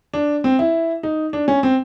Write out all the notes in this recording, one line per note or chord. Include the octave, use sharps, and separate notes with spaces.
D4
C4
E4
D#4
D4
C#4
C4